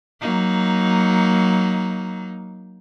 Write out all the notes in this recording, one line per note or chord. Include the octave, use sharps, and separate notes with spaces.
F#3 A#3 D#4